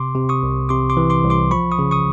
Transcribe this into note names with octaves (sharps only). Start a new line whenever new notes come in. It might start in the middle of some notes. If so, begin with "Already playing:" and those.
Already playing: C3 C6 D6
C3
C#6 D#6
C2
C3 C6 D6
C6 D6
E3
C6 D6
C2
C6 D6
F3 B5 C#6
C#6 D#6
C#3
C#6 D#6